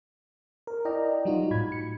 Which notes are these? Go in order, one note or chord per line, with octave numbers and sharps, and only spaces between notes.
A#4
E4 D5 D#5 G5 A#5
F#3 G3 D#4 F4 F#4
A2 B5 G#6
C#7